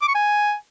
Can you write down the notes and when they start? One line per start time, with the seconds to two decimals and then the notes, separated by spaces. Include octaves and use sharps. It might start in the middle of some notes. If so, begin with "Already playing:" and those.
0.02 D6
0.08 C#6
0.15 G#5